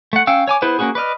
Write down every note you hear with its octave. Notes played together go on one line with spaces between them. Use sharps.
A3 F#5
C#4 F5 G5 E6
C#5 G#5 D6
B3 E4 G#4 B4 C5
A#3 C4 C#4 F#4 G#4
B4 D5 D#5 F6